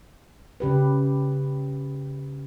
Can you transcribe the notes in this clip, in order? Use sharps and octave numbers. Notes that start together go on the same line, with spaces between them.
C#3 G4 B4